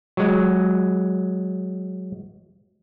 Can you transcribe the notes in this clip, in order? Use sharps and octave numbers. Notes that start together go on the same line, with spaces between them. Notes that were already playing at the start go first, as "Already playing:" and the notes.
F#3 G#3